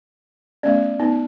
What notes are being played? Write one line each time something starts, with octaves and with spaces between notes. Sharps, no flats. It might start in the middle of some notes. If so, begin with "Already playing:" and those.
A3 B3 C#4 D5
B3 D#4